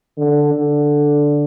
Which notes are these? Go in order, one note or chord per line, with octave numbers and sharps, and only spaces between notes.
D3
D3